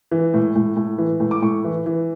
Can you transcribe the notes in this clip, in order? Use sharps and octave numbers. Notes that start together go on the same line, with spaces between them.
E3
A2
A2
A2
E3
A2
D6
A2 C#6
E3
E3